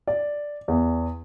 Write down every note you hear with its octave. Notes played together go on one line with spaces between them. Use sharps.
D5
E2